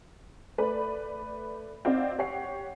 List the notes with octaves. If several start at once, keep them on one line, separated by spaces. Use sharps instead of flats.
A3 B4 D5 B5
C4 D#4 F#4 D5 F5
G4 C#5 F#5 C7